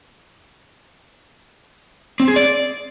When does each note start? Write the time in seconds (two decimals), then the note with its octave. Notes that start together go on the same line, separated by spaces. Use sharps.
2.20 C4
2.28 G#4
2.36 D5